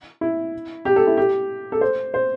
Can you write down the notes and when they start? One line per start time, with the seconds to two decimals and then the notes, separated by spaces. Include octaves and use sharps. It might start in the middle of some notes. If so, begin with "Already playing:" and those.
0.21 E4
0.85 G4
0.96 A4
1.07 E4
1.17 G4
1.72 A4
1.81 C5
2.14 C5